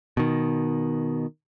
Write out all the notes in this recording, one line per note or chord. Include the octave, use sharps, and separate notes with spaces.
B2 D#3